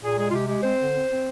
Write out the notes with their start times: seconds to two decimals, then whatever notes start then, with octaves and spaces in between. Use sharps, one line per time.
0.03 A#2 G#4
0.18 G#3 G#4
0.29 F4
0.33 C3 G4
0.48 G#3 G4
0.63 C4 C5
0.80 D3
0.94 C4
1.10 C4